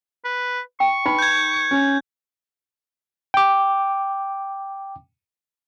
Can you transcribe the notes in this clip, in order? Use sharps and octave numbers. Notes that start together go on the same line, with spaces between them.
B4
G5 C#6
D#4 B4 B5
G6 G#6
C#4
G5 D6